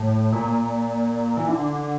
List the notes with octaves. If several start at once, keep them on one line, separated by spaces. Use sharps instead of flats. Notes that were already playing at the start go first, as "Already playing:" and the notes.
Already playing: A2
A#2
E3
D3